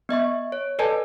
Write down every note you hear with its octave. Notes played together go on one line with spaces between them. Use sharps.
B3 D#5 E5 C#6
C#5
A4 B4 D5 D#5 G#5 A5